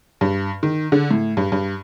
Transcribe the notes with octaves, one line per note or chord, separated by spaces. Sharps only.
G2
D#3
D3
A2
G2
G2